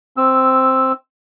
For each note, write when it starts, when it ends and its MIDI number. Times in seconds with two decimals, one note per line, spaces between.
0.17 0.92 60
0.17 0.92 88